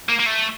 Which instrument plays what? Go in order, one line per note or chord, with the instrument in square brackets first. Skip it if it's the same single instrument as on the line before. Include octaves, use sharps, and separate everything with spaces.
[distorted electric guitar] A#3
A#3
A3